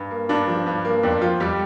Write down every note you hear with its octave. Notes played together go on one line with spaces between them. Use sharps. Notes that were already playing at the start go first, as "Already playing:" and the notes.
Already playing: G2
A#3
G2 D4
F3
G2
A#3
F2 D4
F3 F4
F2 G3 G4